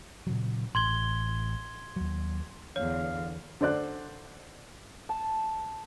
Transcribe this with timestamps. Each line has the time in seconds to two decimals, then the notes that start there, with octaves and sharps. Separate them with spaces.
0.27 A#2 C#3 F#3
0.75 A1 C6 G#6 G7
1.96 D#2 F#3
2.76 E2 D3 C#5 F5
3.61 D3 C5 D5 F#6
5.09 A5